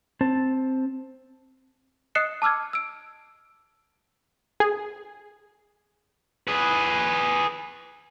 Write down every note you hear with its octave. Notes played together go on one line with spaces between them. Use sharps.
C4 C5 A5
D#5 D#6 F#6 C7 C#7 E7
A5 D6 E6 F6 G#6
E6 D7
G#4
G#4 B4